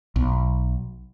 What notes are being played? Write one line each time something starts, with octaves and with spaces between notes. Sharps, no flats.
B1